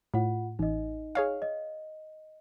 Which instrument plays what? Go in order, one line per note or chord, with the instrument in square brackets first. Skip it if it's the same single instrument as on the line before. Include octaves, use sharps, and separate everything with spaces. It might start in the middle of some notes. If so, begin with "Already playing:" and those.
[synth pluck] A2 [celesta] F4 F#5
[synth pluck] A1 [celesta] D#4 D#5
[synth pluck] G#4 C#5 F5
[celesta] D#5